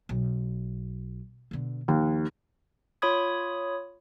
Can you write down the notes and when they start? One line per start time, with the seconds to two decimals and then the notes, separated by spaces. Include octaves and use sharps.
0.09 B1
1.51 B2 D3
1.88 D#2 F3
3.02 F4 C#5 B5 D#6 G#6